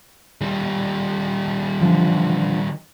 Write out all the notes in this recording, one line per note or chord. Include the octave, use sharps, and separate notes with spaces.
D#3 G3
D3 E3 F3